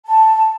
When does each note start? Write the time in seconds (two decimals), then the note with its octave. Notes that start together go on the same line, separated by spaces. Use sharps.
0.06 A5